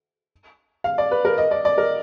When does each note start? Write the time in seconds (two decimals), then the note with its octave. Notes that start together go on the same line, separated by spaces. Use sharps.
0.84 F5
0.98 D5
1.11 B4
1.25 A#4
1.38 D#5
1.51 D5
1.65 D5
1.78 A#4